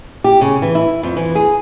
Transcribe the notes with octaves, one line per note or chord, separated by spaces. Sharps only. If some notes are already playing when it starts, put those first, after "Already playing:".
G4
C#3
E3
E4
F2
E3
G#4